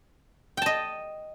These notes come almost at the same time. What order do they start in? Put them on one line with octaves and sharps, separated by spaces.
G5 A5 D#5